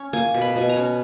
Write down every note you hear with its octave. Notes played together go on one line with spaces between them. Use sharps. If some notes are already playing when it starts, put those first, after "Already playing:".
Already playing: C#4
A#3 G#5
B2
B5
B2 G#5
A#5
C#4